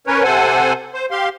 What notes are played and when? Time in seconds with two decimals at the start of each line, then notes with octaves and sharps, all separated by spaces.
0.07 C#4 A#4 B4 C#5
0.24 C3 A4 C5 F#5 G#5
0.94 C5
1.11 G4 F5 C6